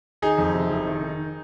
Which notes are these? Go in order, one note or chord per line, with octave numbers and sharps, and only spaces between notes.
D#3 D#4 G#4
F2
C3
F1
D#3
D#3